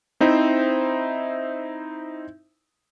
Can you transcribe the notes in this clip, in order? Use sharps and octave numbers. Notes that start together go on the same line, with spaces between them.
C4 D#4 E4 C5 E5